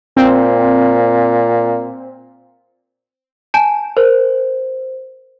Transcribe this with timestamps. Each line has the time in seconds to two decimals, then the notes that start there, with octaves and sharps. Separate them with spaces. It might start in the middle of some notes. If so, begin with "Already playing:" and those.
0.17 A#2 C4
3.54 G#5 A5 G6
3.97 A#4 C5